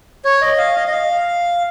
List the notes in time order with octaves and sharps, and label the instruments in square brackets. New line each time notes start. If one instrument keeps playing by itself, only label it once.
[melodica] C#5
D#5
F5
D#5
D#5
F5